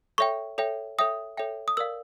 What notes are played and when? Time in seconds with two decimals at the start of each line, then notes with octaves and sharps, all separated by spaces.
0.18 A4 C#5 E5 G5 C#6
0.58 A4 C#5 E5 G5
0.98 A4 C#5 E5 G5 D#6
1.37 A4 C#5 E5 G5
1.68 D#6
1.77 A#4 D5 F5 E6